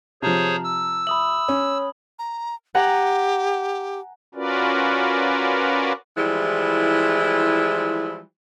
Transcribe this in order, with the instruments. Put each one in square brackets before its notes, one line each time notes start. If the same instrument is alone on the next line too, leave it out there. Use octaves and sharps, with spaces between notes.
[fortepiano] C3 F3 [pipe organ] G#4 C5 C#5 [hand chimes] A5 A#5 F6
[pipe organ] E6
[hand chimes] E5 [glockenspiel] B5 D#6 F#7
[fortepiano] C#4 [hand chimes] C#5
[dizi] A#5
[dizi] G4 [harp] F#5 G#5 A#5
[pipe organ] C#4 F4 F#4 A#4 B4 D5
[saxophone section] E3 F3 G3 G#3 E4